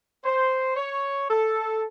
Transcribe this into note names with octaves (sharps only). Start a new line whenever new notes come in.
C5
C#5
A4